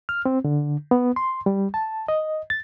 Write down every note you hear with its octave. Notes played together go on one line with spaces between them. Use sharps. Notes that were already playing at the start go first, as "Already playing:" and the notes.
F6
C4
D3
B3
C6
G3
A5
D#5
A6